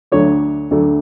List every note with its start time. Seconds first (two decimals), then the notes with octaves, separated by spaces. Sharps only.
0.12 D2 D3 F#3 A3 C#5
0.71 D2 D3 F#3 A3